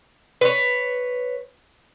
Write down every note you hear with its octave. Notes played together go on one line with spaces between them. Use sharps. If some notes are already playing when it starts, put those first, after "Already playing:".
B4 C#5